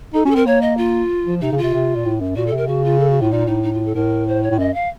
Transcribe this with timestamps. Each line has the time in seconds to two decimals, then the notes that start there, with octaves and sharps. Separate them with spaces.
0.14 D#4 A4
0.25 C#4 F#4
0.31 A4
0.35 C4 A#4
0.46 A#3 C#5
0.62 D#5
0.77 F4
1.26 F3
1.41 C3 D#4
1.52 C#3
1.58 F4
1.63 C3
1.73 C3
1.96 A#2
2.05 A2
2.21 F#2
2.36 A#2 F#4
2.47 A4
2.53 C3 A#4
2.68 C#3 F#4
2.85 F4
3.00 A4
3.10 F#4
3.21 A2 F4
3.31 A#2 D#4
3.47 A2 D#4
3.63 D#4
3.74 F4
3.85 A4
3.95 A2 A#4
4.28 C5
4.43 C#5
4.51 A2
4.59 F#2 D#5
4.74 F5